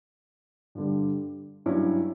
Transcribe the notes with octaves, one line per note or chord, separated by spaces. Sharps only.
G2 D3 G3
G2 F#3 C#4 E4